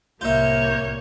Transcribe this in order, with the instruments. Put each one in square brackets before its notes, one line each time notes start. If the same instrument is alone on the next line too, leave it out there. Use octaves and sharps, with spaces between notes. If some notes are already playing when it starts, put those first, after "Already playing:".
[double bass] C2 A2 [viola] A#3 C#5 [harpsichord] F4 E5 [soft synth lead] G6